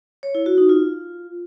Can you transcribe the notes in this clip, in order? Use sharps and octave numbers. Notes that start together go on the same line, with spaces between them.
C#5
E4
F#4
D#4
F4